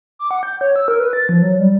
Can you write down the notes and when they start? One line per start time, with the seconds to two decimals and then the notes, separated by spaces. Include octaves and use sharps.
0.19 D6
0.31 F#5
0.43 G6
0.61 C#5
0.76 E6
0.88 A#4
1.00 B4
1.13 A6
1.29 F3
1.42 F#3
1.59 G3